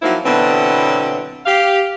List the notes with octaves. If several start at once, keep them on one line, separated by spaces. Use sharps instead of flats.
F3 F#3 A#3 C4 D#4 E4
B2 D3 E3 F#3 B3 C4
G4 F5